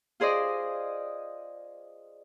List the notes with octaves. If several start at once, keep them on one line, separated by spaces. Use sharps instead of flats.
F4 G#4 C5 D5 D#5